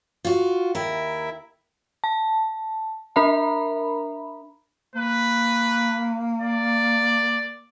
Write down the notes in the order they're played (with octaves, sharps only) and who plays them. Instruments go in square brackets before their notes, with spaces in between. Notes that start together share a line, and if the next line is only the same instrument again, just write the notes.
[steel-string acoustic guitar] F4 F#4
[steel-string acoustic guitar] D#2 A#4 [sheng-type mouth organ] E4 E5
[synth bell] A5
D4 A#4 E5 A#5 B5
[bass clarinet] A#3 [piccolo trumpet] B4
[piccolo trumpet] D5